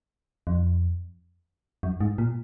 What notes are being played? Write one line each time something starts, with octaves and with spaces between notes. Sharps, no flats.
F2
F#2
G#2
A#2